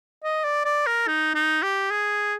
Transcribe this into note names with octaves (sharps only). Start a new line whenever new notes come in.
D#5
D5
D5
A#4
D#4
D#4
G4
G#4